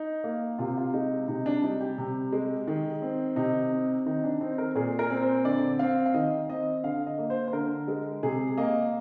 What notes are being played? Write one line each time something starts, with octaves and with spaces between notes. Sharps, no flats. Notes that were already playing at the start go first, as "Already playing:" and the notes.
Already playing: D#4
A#3
C3 F4
G4
F4
G#3 D#4
C3 D#4
D4
G3 D#4
G4
C3
G#3
D#3
C4
C3 D#4
C4
D#3 D#4
D4
C4 D#4
A#4
A#2 G#4
A#4
C4
C5
D3 D5
C4 F5
F5
D#3 D#5
C4 D#5
D3 F5
D#5
A#3
C5
C5
D3 A#4
G#3
C3 G#4
A#3 D#5